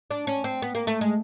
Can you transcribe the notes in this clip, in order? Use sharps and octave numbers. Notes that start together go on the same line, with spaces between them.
D4
C#4
C4
B3
A#3
A3
G#3